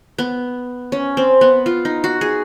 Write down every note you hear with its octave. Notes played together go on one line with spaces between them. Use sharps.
B3
C#4
C4
B3
F4
D#4
F#4
G#4